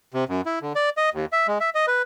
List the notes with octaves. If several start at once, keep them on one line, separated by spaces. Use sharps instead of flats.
C3
F#2
E4
D3
D5
D#5
D#2
E5
G#3
E5
D#5
B4